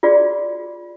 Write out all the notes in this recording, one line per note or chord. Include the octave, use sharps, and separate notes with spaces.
F4 F#4 G#4 D5